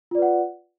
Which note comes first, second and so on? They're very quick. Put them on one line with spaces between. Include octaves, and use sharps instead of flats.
F4 D5 B4 F#5